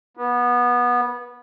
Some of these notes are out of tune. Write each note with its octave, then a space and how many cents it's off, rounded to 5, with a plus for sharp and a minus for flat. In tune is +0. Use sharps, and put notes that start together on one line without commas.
B3 -20